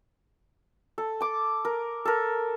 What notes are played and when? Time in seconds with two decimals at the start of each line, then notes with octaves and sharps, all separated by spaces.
0.98 A4
1.21 A5 D6
1.65 A#4
2.05 A4 A#4